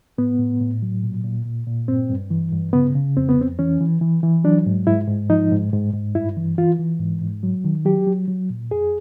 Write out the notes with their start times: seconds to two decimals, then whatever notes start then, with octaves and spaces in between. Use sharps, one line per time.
0.18 A2 B3
0.39 A2
0.61 A2
0.82 F#3
1.03 A#2
1.24 A#2
1.45 A#2
1.67 A#2
1.88 G2 C4
2.10 G2
2.30 E3
2.52 G2
2.73 C#3 B3
2.95 C#3
3.17 F2 C4
3.29 B3
3.37 F2 C4
3.59 E3 C#4
3.81 E3
4.01 E3
4.23 E3
4.44 F#3 D4
4.66 G#2
4.87 G#2 E4
5.08 G#2
5.30 F3 D#4
5.51 G#2
5.73 G#2
5.93 G#2
6.15 G2 E4
6.37 E3
6.58 E3 F4
6.79 E3
7.00 G#2
7.22 G#2
7.43 F#3
7.64 D#3
7.85 F#3 G4
8.07 F#3
8.28 F#3
8.50 A#2
8.71 F2 G#4